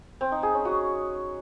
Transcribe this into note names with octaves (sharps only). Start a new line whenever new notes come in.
C4
D#4
G#4
C#4
F#4